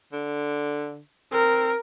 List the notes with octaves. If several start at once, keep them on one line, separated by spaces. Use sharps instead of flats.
D3
C4 A#4